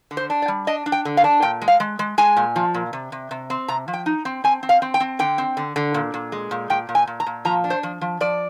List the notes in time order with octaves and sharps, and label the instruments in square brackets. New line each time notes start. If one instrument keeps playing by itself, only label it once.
[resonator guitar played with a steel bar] D3
C5
D4
D5
G3
D4 D#5
D4
G5
D3
F5
D4
A#2 G5
G#3
F5
G#3
G#3
G#3 G#5
A#2
F3
A#2
C3
C3
C3
C4
C3 A#5
F3
G5
D#4
C4
C4 G#5
C4
F5
C4
G5
C4
D3 G5
C4
D3
D3
A#2
A#2
G#3
A#2
A#2 G5
A#2
G#5
A#2
A#5
A#2
F3 A#5
D4
C5
F3
F3
F3 D5